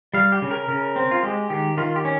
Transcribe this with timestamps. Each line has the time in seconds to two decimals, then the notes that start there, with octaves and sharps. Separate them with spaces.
0.14 G3 F5
0.32 G4
0.42 C#3
0.51 A#4
0.68 C#3 A#4
0.96 C4
1.11 F4
1.22 G#3 G4
1.50 D#3 G4
1.77 D#3 F4
1.96 G4
2.05 C#4